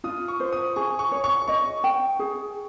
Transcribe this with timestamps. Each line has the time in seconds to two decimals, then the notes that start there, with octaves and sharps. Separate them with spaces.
0.04 F4 D#6
0.28 C#6
0.40 C5
0.53 D#6
0.76 G#4 C#6
0.99 C#6
1.12 C#5
1.24 C#6
1.48 D#5 C#6
1.84 G5
2.19 G#4